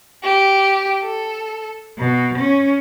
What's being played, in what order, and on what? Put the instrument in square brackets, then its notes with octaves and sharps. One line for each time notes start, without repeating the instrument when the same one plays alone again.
[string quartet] G4
A4
B2
C#4